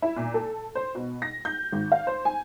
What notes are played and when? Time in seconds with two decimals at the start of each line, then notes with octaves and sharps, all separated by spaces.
0.02 E4
0.17 A#2
0.34 A4
0.75 C5
0.95 B2
1.22 A#6
1.45 G6
1.72 G#1
1.92 F5
2.07 C5
2.25 G#5